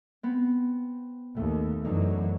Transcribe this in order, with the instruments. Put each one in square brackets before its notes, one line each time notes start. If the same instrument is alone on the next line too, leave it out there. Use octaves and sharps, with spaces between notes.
[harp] B3 C4
[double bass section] D#2 [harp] A3
[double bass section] F#2 E3 F#3 [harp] D3 D#4